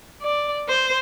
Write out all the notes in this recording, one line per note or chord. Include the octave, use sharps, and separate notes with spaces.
D5
C5